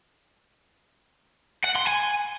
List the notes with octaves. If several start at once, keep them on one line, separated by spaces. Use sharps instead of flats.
F#5
C6
G#5